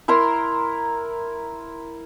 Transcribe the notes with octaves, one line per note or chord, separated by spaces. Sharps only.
E4 A#4 A#5 C6